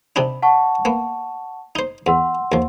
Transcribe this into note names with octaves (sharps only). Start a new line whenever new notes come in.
C3 D4 D#4 B5
F#5 A5 C#6
A#3 B3
D#4 C5
E2 F#5 C6 E6
D#2 F3